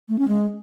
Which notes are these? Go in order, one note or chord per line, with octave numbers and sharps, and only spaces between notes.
A3
C#4
G#3